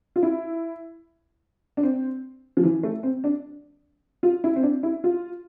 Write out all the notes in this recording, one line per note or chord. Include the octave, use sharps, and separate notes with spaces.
F4
E4
D4
C4
F3
E3
A3
C4
D4
F4
E4
C4
D4
E4
F4